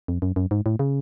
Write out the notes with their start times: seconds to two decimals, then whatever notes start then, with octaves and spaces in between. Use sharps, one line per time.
0.08 F2
0.22 F#2
0.36 F#2
0.51 G#2
0.66 A2
0.79 C#3